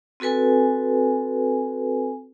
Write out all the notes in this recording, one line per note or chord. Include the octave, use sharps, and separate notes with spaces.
C4 F#4 A4 B4 G#5